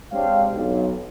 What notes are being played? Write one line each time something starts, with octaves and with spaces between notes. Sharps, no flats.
G#3 C4 D4 G4 C#5 F5
B1